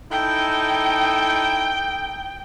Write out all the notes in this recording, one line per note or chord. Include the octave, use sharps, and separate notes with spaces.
D#4 E4 A4 G5